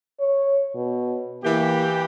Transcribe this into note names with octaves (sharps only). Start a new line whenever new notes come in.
C#5
B2
E3 A#3 G4